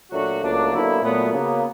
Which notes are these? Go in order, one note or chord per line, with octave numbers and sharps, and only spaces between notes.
A#2 F#3 A3 D4 F#4
C#2 C#3 F#3 A3 A#3 D4
D3 F#3 B3 E4
A#2 F#3 A3 B3
C#3 F#3 A#3 B3